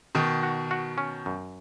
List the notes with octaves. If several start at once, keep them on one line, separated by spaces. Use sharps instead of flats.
B2 D#3 D#4
F#4
F#4
C#4
F#2